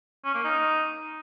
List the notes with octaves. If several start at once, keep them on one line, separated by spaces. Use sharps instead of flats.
C#4
A#3
D#4